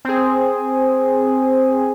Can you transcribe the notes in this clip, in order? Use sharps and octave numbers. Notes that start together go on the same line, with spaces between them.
C4 G#4